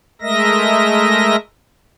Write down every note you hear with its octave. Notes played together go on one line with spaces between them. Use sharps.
G#3 A3 A#4 D#5 E5 A#6